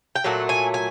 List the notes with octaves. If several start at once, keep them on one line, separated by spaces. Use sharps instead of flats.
G5
A#2 F#3 A3 F#5
G#5
G#5